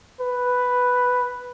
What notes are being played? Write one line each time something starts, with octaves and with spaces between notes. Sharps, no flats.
B4